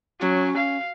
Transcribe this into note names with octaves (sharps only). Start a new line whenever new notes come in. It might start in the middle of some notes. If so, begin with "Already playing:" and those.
F#3 C#4
F5